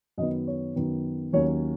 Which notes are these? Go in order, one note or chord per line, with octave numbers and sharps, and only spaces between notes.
F#2 D#3 B3 D#5
C#5
F#2 D#3 B3
D#2 D#3 F#3 C#4 C#5